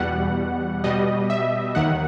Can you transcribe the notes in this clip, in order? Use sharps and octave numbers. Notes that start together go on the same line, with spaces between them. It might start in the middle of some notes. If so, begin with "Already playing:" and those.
Already playing: E2 B2 G3 F#5
B2 G3 D#5
E5
D#2 D#3 F#5